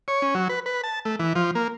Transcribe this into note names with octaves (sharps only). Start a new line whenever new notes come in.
C#5
C#4
F#3
B4
B4
A5
A3
E3
F3
A#3